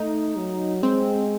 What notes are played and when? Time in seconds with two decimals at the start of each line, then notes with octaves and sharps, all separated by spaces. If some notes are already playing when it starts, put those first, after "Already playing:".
Already playing: A3 D#4
0.36 F#3
0.82 G#3 C4